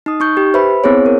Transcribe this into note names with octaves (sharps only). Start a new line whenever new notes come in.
D#4 D#6
D#4 C#6 G6
G4
B4 C5 E5 B5
B3 C4 E4 G#4 C5 C#5
A#4